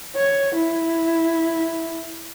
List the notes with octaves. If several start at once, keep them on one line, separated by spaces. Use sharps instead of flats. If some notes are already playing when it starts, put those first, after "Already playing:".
C#5
E4